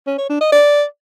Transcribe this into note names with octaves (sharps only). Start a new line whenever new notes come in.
C#4
C#5
D4
D#5
D5